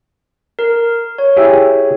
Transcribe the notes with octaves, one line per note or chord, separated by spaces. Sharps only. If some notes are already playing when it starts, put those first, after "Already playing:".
A#4
C#5
E4 G4 G#4